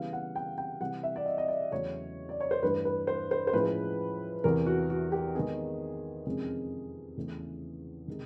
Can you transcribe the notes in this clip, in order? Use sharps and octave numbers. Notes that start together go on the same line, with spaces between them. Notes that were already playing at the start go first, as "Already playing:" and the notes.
Already playing: C#3 E3 G3 B3 E4 F5
F#5
G5
G5
C3 E3 G3 F#5
E5
D5
D#5
D#5
D5
E2 C#3 F#3 A3 C#5
D5
C#5
C5
G2 E3 A3 D4 B4
B4
C5
C5
C5
A2 F3 G#3 C#4 E4 B4
E2 C3 E3 A#4
F#4
F#4
G4
D#3 G#3 B3 D#4 G#4
F2 C3 D#3 G#3 C#4
E2 C#3 E3 A3
C3 D#3 G#3